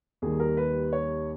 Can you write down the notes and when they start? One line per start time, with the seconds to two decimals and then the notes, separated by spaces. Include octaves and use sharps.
0.22 D#2 D#3 G3 G#4
0.40 A#4
0.57 B4
0.93 C#5